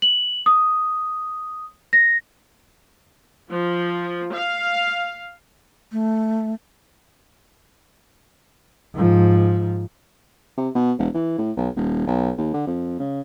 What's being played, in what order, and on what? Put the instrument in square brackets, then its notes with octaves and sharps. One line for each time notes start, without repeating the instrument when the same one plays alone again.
[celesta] F#7
D#6
A#6
[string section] F3
F5
[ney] A3
[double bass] G#2 F3
[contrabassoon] C3
B2
E1
E3
A2
B1
D#1
B1
D#2
D3
F2
C#3